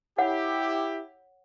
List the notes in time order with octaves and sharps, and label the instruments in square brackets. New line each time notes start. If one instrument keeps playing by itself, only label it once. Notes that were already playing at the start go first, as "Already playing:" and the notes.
[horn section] E4 G4 [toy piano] C#5 F#5